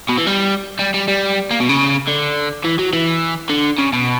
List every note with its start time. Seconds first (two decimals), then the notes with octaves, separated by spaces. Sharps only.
0.09 B2
0.18 E3
0.27 G3
0.79 G3
0.94 G3
1.08 G3
1.51 A#3
1.60 B2
1.69 C#3
2.07 D3
2.64 E3
2.79 F#3
2.93 E3
3.50 D3
3.79 C#3
3.93 B2